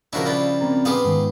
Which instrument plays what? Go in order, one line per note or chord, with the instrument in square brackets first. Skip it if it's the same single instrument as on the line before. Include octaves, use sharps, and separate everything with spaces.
[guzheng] C#3 F3 D4 [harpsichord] E4 F#4 A#4
[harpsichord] G3 E4 F4
[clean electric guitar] C4 A#4 A#5
[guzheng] B3 F4 [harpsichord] G4 G#4 F5
[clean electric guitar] G#2 D#3